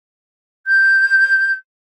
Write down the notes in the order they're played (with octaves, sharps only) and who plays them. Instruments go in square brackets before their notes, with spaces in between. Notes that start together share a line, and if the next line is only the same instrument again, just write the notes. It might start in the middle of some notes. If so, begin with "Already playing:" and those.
[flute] G6